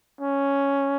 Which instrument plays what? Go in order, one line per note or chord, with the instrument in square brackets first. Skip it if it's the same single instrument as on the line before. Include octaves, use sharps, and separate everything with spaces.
[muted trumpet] C#4